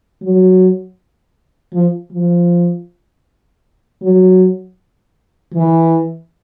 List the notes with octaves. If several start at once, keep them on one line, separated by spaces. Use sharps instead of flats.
F#3
F3
F3
F#3
E3